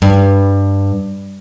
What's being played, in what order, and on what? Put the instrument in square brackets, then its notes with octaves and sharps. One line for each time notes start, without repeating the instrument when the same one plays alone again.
[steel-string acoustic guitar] G2